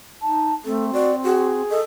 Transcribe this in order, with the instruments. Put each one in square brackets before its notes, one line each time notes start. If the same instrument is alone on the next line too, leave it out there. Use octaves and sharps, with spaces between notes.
[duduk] D#4 [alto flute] A5
[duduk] A3 [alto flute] C4 [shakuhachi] A4
[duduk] F#4 [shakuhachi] D5
[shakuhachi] F#4 [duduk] G#4
[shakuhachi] A4 [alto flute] D#5